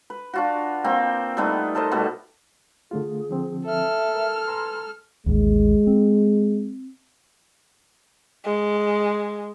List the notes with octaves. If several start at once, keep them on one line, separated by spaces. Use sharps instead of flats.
B4
D4 F4 F#4
A#3 C4 G5
G3 A3 B3 D#4
A4 A#4 C5 D#5
B2 G3 A3 B3
D3 A3 F4 G#4
D3 F3 C4
A4 E5 F6
A#4
B4 G#5 A#5 C6
A1 D#2 G#3
C4
G#3